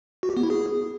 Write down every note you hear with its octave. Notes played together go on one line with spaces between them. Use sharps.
F#4
G4
B3
E4
G#4